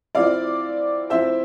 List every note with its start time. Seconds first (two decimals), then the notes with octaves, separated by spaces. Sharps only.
0.15 F3 C4 E4 D5 F5
1.10 F3 C4 E4 C5 E5